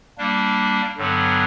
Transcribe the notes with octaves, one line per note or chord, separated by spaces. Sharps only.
G3 A#3 D4
G2 D3 F#3 B3